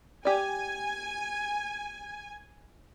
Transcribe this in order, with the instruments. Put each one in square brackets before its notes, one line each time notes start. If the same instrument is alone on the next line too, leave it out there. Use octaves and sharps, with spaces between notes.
[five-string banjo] G4 D5 [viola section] G#5